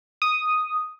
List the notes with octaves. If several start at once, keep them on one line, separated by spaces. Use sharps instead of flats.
D#6